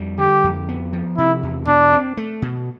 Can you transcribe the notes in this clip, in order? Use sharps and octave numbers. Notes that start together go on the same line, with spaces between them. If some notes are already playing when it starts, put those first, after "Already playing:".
Already playing: F2 G3
D3 G4
F2
B3
F3
C3 E4
E2
B2 D4
C4
A3
B2